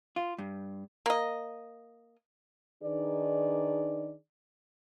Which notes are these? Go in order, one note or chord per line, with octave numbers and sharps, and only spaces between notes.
F4
G2
A#3 D#5
D#3 D4 D#4 G#4 B4 D5